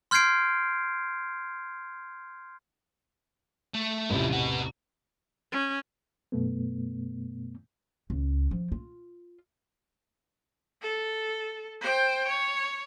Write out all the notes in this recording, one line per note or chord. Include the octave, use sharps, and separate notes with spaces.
C6 F6 G6 G#6 C7 D7
A3
A1 E2 C3 F3 E4
B3 F#4
C#4
F#2 B2 A3 B3
C#2
F3
F4
A4
C5 G5
C#5